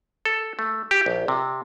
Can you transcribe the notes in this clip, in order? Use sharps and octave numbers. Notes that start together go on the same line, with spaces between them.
A4
A3
G4
A#1
C3